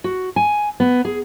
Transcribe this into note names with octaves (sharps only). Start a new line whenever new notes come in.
F#4
G#5
B3
G#4